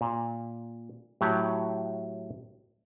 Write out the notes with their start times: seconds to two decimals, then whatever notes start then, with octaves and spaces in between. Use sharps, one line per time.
0.01 A#2
1.21 A2 F#3 G4 F#5